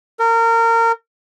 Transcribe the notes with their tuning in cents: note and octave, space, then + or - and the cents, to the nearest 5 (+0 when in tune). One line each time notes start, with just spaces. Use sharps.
A#4 -25